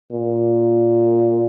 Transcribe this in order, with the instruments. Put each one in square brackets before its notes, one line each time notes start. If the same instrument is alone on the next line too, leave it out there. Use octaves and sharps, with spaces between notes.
[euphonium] A#2